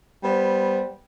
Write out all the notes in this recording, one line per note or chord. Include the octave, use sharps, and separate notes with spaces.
G3 B3 C5